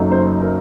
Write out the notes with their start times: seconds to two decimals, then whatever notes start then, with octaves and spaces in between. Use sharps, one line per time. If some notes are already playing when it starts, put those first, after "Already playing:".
Already playing: F#1 F#2 F#3 A3 D#4
0.12 C5
0.41 A#4